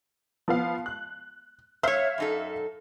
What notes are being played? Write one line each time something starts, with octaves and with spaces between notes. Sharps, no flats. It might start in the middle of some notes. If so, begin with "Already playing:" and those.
F3 B3 F5
F#6
C5 C#5 E5 F5 F6
F#2 D#4 A4